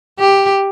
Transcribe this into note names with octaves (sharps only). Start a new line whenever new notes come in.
G4